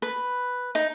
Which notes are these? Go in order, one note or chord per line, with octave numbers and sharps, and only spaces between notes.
B4
D#4